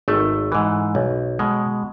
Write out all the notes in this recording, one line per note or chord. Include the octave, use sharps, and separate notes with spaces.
G#1 A3
G#2 E3
B1
B2 G#3